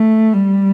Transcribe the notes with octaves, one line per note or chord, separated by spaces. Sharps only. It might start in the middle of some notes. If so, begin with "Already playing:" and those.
Already playing: A3
G3